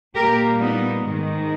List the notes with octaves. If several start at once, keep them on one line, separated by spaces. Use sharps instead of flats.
A#2 G3 A#3 G4 A#4
B3 D#4
G#2 D#3 G#3